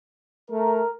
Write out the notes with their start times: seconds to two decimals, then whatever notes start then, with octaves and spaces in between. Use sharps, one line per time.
0.51 A3 A#4